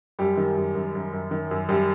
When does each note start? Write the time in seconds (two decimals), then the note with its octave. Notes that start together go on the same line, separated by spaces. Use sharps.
0.19 F#2 G3 G4
0.37 D#3
0.57 F#2
0.75 F#2
0.95 F#2
1.13 F#2
1.31 D#3
1.51 F#2
1.69 F#2 G3 G4